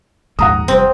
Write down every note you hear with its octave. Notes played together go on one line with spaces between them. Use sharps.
A#1 D#2 G#2 F#5 A#5 D#6
F1 G3 C4